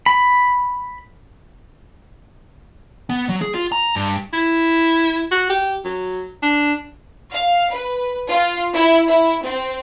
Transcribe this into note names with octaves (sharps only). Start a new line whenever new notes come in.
B5
B3
F#3
G#4
F4
A#5
G2
E4
F#4
G4
F#3
D4
F5
B4
F4
E4
E4
C4